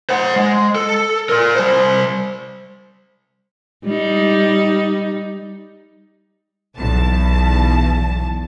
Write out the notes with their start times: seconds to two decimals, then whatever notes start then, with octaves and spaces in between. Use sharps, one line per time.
0.10 C5 F#5
0.36 G#3
0.76 A4
1.29 A#4 D5
1.55 G3 C5
3.85 G3 D#4
6.77 B1 E2 A5